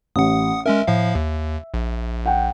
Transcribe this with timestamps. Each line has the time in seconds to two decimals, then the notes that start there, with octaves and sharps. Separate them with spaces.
0.16 A1 F#5 D#6
0.66 G#3 C#4 A#4 E5
0.87 A2 F3 F5
1.15 D#2
1.74 A#1
2.26 F#5 G5